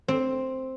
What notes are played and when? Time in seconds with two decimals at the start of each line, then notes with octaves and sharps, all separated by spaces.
0.08 C4